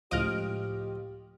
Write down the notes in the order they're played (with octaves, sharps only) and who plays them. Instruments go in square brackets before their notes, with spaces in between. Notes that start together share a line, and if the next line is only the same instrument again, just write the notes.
[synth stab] C#2 D#5 [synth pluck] A2 F6 D7 [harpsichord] F3 [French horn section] G4